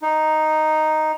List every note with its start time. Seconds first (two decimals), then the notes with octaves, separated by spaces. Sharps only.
0.02 D#4